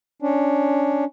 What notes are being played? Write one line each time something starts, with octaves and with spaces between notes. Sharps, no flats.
C#4 D4